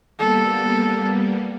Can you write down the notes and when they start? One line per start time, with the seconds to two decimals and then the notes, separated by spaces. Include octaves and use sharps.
0.19 G3 A#3 B3 A4